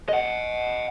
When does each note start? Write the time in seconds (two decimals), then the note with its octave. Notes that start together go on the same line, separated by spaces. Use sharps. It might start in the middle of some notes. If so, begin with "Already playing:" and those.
0.09 D#5 F#5